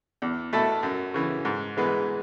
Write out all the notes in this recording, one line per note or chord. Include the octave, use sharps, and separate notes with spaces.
E2
B2 A3 E4 A4
F#2
C#3 E3
G#2
E3 G#3 B3